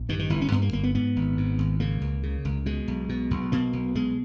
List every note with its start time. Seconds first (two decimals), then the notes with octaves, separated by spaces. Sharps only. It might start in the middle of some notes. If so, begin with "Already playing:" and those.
Already playing: A#1
0.09 G2 D#3
0.19 D#3
0.30 G1 E3
0.41 C#4
0.52 G2 B3
0.62 A#3
0.73 G1 A#3
0.83 B3
0.95 G#2 B3
1.16 G#1
1.37 G#2
1.58 G#1
1.80 C#3 A#3
2.01 C#2
2.23 C#3
2.45 C#2
2.66 B2 G#3
2.88 B1
3.09 B2
3.31 B1
3.52 B2 A#3
3.73 B1
3.95 B2 G#3